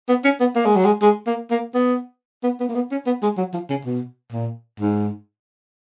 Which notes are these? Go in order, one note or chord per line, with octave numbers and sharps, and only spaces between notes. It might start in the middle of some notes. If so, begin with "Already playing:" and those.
B3
C#4
B3
A#3
G#3
F#3
G#3
G#3
A#3
A#3
B3
B3
B3
A#3
B3
C#4
B3
G#3
F#3
F3
C#3
B2
A#2
G#2